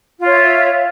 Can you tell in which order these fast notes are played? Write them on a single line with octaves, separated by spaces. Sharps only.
F4 C#5 E5